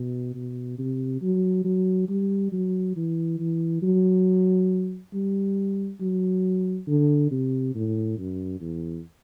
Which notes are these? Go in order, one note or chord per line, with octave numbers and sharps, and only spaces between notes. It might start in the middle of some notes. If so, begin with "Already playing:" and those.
Already playing: B2
B2
C3
F#3
F#3
G3
F#3
E3
E3
F#3
G3
F#3
D3
C3
A2
F#2
E2